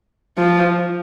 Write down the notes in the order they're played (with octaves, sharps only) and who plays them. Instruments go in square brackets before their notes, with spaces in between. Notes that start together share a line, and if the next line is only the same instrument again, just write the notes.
[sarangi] F3